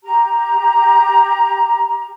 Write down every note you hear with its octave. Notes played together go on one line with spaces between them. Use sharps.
G4 A#5